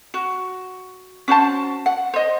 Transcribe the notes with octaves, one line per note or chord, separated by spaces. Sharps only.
F#4
C#4 F#4 C5 A5
F#5
C5 D#5